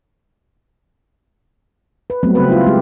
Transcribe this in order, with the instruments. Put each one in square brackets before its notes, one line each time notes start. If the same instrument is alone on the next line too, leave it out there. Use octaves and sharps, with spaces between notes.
[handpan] B4
F#3 G3 A3 B3 C4
C#3 C4 B4
E4 F4
G#3 G4